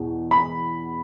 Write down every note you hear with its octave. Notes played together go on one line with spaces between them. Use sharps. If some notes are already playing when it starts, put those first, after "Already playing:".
Already playing: E2 B2
B5